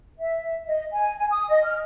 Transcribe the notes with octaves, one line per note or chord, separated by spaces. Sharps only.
E5
D#5
G#5
G#5
D#6
D#5
F6